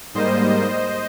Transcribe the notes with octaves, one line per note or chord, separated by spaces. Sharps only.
G#2 G3 A#3 C5 D#5
C5 D#5